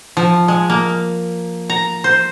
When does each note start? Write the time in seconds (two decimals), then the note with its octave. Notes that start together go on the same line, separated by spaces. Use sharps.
0.17 F3
0.48 G#3
0.70 A#3
1.70 A#5
2.04 C5